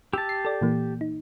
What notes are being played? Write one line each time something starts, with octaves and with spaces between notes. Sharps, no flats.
G4 A5 E6
C7
A4 D5
A#2 E3 A#3
D#4